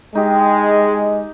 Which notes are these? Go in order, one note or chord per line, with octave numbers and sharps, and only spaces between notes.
G#3 D#4 G4